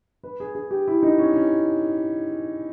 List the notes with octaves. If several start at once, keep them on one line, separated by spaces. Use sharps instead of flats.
B4
G#4
G#4
G4
E4
D#4
C#4
C#4